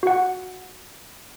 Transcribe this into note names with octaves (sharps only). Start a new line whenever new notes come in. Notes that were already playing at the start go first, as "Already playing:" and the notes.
F#4 F#5